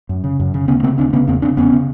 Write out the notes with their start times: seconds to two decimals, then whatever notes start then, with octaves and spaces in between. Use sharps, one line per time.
0.09 F#2
0.24 C#3
0.40 F#2
0.54 C#3
0.68 D2 B3 C#4
0.83 C#3 A#3 C4
0.98 D2 C4 D4
1.13 C#3 B3 C#4
1.28 E2 A#3 C4
1.42 C#3 C4 D4
1.57 E2 B3 C#4
1.73 C#3